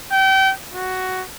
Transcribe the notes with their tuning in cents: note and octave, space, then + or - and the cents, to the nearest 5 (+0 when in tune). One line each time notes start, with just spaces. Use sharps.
G5 -30
F#4 +10